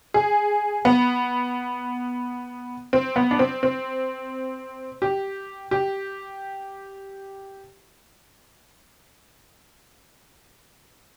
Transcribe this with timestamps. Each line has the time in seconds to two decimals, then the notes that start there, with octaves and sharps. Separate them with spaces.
0.14 G#4
0.85 B3
2.93 C4
3.16 B3
3.31 D4
3.39 C4
3.63 C4
5.02 G4
5.71 G4